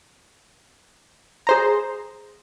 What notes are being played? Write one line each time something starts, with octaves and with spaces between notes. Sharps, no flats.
G#4 C5 A#5